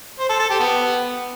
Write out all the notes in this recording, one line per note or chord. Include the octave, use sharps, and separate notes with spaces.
C5
A4
A4
G4
B3